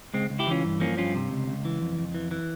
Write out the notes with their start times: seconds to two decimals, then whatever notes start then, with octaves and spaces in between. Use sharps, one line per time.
0.14 C#2 G#3 C4
0.30 C#2
0.39 E4 G4
0.47 E3 C#4 F4
0.65 G2
0.80 F3 A#3 C#4
0.97 G2 C#4 F4
1.15 C3
1.31 C#2
1.48 C#2
1.65 E3
1.81 F2
1.98 F2
2.15 E3
2.31 E3